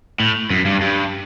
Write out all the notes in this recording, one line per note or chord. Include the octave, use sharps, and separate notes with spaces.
A2
F#2
G2
G2